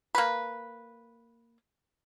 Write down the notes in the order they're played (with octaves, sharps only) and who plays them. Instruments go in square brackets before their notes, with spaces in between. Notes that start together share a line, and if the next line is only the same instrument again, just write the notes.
[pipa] A#3 B4